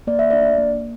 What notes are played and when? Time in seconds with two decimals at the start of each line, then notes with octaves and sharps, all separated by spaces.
0.07 A#3 D5
0.19 E5
0.31 D4 D5
0.58 A#3